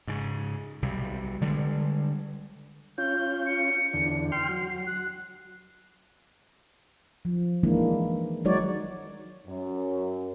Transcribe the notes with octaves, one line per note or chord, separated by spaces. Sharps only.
G#2 C#3
B1 C3 G3
D3 G3 G#3
C#4 F4 G6
C#7
E2 D3
G5 C6 F6 C7
F#3
F#6
F3
D#3 E3 G#3 A#3 D4 E4
F#3 G#3 D#4 F#4 C#5 D5
F#2